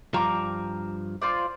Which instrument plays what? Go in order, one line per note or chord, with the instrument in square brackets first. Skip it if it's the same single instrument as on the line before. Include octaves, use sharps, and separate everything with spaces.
[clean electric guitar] G2 F3 [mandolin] A#5 C#6 D6
[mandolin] F4 C5 D5